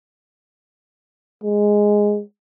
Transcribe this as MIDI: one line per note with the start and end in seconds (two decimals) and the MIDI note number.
1.44 2.22 56